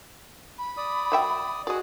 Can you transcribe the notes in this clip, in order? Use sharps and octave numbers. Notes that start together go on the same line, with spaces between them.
B5
D5 D#6
F#3 E5 G5
F#4 G#4 D5 D#5